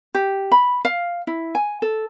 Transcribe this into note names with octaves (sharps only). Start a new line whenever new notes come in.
G4
B5
F5
E4
G#5
A4